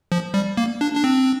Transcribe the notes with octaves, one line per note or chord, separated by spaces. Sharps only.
F3
G3
A#3
D4
D4
C4